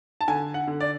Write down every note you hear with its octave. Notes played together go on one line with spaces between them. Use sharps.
A5
D3 G#5
F#5
D3
D5